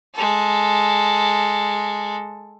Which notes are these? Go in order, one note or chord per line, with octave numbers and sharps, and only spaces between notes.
G#3 A4